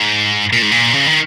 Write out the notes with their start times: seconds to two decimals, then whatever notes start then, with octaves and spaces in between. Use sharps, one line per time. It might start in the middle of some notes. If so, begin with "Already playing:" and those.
Already playing: G#2
0.53 A#2
0.62 G#2
0.72 A#2
0.93 C#3
1.07 D#3